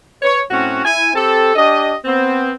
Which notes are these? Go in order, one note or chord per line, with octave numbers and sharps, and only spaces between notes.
B4 C#5
A2 C4 C#4 F#4
E4 G#5
C4 G4 A4
D4 G4 D#5
B3 C4